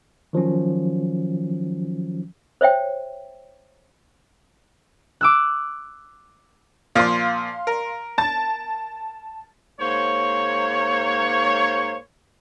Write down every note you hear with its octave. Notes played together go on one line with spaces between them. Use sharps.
D#3 F3 F#3 C#4
C5 C#5 E5 G5
D6 E6 F#6
A#2 F3 F5 C6 D6
A#4
A5 A6
G#2 A#3 C5 C#5